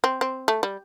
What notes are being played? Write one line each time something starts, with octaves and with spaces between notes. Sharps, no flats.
C4
C4
A3
G3